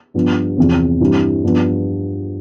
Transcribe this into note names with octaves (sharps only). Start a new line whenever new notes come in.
G2 F3 B3
E2 C3 F3 C4
G2 E3 G3 C4
G2 F3 B3